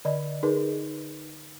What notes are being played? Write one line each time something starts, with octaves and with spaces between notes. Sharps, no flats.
D3 D5 D#5
D#4 G#4 A#4 B4